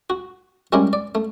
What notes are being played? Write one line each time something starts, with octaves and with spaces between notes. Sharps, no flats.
F#4
G3 G#3 C#4 E4 G4 A#4
D5
A3